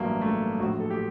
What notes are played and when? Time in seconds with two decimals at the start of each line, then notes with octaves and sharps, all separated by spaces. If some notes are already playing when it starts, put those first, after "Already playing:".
Already playing: A1 G2 F#3 A#3
0.22 A3
0.60 A#1 A2 F#3 F#4
0.80 A4
0.90 G4